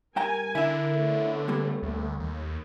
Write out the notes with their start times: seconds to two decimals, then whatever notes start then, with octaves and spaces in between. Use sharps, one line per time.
0.16 G2 A#4 G5 G#5 A#5
0.55 D3 E4 A#4 E5
0.92 A3 B3 C#4
1.48 G3 A#3
1.83 D2
2.20 D#2